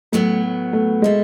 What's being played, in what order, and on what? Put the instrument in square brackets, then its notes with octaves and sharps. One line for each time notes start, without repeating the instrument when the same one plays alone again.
[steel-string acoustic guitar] A2 F#3 B3 [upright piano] A3
[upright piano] A3
[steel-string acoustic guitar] B2 A3 [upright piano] G#3